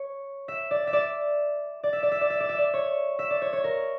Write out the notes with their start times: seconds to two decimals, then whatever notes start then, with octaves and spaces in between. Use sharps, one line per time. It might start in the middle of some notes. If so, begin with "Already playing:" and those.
Already playing: C#5
0.48 E5
0.71 D5
0.87 E5
0.93 D5
1.84 D5
1.93 E5
2.03 D5
2.12 E5
2.21 D5
2.30 E5
2.40 D5
2.49 E5
2.58 D5
2.74 C#5
3.19 E5
3.30 D5
3.42 C#5
3.53 C#5
3.64 A#4